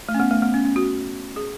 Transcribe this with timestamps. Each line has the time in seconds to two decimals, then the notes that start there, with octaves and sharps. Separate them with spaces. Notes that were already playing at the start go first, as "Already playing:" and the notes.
0.09 A3
0.14 C#4
0.20 B3
0.31 A3
0.42 B3
0.54 C#4
0.65 C#4
0.76 F#4
1.36 G#4